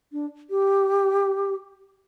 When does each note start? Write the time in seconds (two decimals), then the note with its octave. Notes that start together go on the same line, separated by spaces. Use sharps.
0.13 D4
0.50 G4